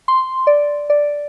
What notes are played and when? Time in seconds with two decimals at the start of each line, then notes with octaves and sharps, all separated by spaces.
0.08 C6
0.47 D5
0.90 D5